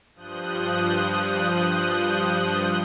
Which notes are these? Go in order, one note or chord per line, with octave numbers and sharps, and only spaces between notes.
G2 F3 D#6 F#6 G6